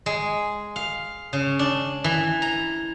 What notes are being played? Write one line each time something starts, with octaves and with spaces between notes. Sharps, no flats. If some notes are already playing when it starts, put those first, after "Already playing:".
G#3
F5
C#3
D4
E3
A#5